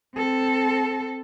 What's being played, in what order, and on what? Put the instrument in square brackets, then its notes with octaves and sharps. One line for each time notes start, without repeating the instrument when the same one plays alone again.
[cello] C4 A4